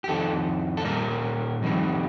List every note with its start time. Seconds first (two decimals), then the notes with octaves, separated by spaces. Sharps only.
0.04 G4
0.08 F2 D#3 A4
0.77 A4
0.85 A#2 G3 A#4
1.62 F2 D#3 G3